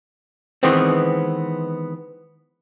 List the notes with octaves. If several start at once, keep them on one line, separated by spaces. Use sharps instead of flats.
D#3 E3 G#3 B3 C4